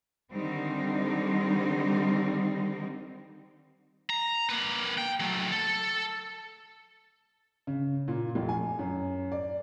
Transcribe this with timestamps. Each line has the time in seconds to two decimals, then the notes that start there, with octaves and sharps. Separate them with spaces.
0.32 D3 D#3 G3 C4 D#4
4.10 A#5
4.49 A#3 B4
4.98 G5
5.20 F#3 A3
5.52 A4
7.67 C#3
8.08 A#2
8.35 F1
8.49 G#5
8.79 F#2
9.32 D5